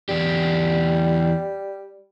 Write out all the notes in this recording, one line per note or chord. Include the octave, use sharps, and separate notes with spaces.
E2 G3 G4